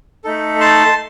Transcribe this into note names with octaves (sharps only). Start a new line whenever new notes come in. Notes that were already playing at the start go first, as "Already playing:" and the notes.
A3 D#4 A4
A5 C6